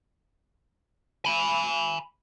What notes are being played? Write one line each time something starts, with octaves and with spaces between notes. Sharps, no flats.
G#5 B5